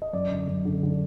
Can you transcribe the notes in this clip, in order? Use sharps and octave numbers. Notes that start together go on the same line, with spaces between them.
D#5
F#2 D5
D3
F#2
D3
D3